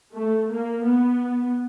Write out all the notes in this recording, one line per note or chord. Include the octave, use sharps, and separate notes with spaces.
A3
A#3
B3